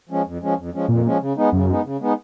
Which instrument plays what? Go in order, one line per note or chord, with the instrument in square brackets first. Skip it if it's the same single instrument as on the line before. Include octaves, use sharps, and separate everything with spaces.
[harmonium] F3 G#3 C#4
F2
F3 G#3 C#4
F2
F3 G#3 C#4
[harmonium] F2 [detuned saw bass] A#2
[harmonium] F3 G#3 C#4
C#3
G#3 B3 D#4
[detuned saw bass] F#2 [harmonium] C#3
[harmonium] G#3 B3 D#4
C#3
G#3 B3 D#4